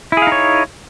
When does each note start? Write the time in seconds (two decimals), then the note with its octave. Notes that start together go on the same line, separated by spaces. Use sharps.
0.12 E4
0.17 G#4
0.22 F5
0.27 D#4
0.32 C#5